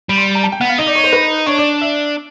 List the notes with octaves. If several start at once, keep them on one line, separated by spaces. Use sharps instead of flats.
G3 B5
C6
A#5
A5
G5
B3 F#5
F5
D#4 D#5
D5
C#5
C5
B4
D4 C#5
D5
E5